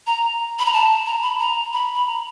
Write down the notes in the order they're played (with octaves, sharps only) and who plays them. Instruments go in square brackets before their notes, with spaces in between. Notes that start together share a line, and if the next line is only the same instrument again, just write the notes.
[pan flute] A#5
B5
A#5
A5
A#5
B5
A#5
B5
B5
A#5